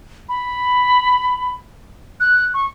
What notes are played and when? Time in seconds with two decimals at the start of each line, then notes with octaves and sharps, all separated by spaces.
0.29 B5
2.20 F#6
2.54 C#6